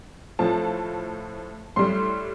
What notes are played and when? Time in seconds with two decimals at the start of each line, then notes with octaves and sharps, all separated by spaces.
0.39 A2 F3 A5
1.76 A2 G3 C6